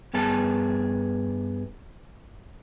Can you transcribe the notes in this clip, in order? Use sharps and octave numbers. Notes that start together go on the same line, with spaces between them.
G2 B3 G#4 A5